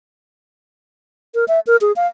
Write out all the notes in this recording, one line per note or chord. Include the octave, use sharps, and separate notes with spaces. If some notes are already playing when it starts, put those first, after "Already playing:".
A#4
E5
A#4
G#4
F5